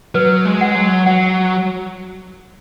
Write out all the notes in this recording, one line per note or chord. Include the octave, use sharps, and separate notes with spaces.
F#3 B4
G#3
F#5
F#3
F#3 F#5